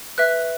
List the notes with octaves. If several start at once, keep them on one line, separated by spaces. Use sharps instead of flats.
B4 E5 F#6